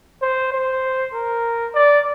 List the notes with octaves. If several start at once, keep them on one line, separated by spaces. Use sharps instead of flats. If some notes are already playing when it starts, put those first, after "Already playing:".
C5
C5
A#4
D5